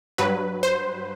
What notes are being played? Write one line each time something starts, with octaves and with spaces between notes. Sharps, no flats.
G2 F#3 B4
C5